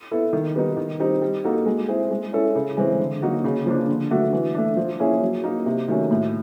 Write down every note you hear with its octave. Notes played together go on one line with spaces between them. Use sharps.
B3 E4 A4
D#3
G3 B3 D#4
D#3
G3 C4 D#4 G4
G3
A#3 D#4 F#4 A4
G#3
C4 E4 G#4
G#3
C#4 E4 A4
C#3
E3 G#3 C4
D3
F#3 A#3 D#4 F#4
C#3
F3 A#3 D4
D3
F#3 A3 D4 F#4
E3
A3 D4
F3
A#3 C#4 E4 G#4
F#3
A#3 D#4
C3
D#3 F#3 A3 C#4
A2